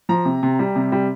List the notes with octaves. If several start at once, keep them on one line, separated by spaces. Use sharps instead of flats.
F3 A#5
C3
C3
G3
C3
G3